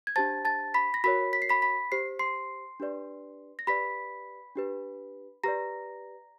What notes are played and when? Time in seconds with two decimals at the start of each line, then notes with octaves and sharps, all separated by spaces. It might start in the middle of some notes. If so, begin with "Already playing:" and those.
0.07 G#6
0.16 D4 G4 C5 A5 A6
0.45 A5 A6
0.74 B5 B6
0.94 A#6
1.04 F#4 A#4 C#5 B5 B6
1.33 B6
1.42 C7
1.49 B5 B6
1.62 B5 B6
1.92 G4 C5 C7
2.19 C6 C7
2.80 D4 G4 B4 D5
3.59 A#6
3.67 G4 B4 D5 B5 B6
4.56 D4 G4 B4
5.44 G4 B4 D5 A#5 A#6